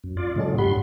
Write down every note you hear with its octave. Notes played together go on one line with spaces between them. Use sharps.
F#2
F4 D5
A2 C#3 F#3 G#3 A4
G2 G4 F#5 B5 C6